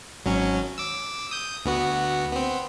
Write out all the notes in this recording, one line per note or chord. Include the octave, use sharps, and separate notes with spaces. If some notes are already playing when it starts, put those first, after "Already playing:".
G#1 F#3 C#4
D6 E6
D#6 G6
D2 B3 F#4
B3 C4